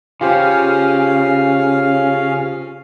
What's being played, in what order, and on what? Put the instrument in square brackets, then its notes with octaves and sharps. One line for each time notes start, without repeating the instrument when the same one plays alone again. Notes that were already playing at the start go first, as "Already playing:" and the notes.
[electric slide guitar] C#3 [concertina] C#4 F5 [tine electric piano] F4 G4 C5